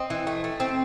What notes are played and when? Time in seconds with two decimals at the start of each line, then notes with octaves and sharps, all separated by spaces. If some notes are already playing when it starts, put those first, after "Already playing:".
Already playing: C4 D#5
0.10 E3
0.27 A3
0.44 A3
0.60 C4